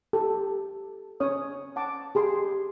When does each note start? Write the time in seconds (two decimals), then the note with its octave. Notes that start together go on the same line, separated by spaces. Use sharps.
0.13 G4 A4
1.20 C#4 C#5 D#6
1.76 F#5 A5 D6
2.15 G4 G#4 C6